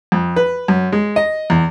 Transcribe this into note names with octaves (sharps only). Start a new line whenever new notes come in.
F2
B4
F#2
G#3
D#5
E2